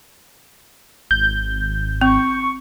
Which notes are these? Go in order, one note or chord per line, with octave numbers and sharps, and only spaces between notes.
G#1 G6
C4 C#6